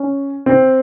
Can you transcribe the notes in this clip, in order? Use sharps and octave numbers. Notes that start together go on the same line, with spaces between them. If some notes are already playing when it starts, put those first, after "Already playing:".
Already playing: C#4
C4